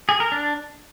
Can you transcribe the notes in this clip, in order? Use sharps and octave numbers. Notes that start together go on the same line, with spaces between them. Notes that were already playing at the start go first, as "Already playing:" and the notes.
G#4
A#4
D4